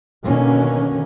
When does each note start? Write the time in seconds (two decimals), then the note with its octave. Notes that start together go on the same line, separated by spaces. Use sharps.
0.25 B2 D3 D#3 A#3 C#4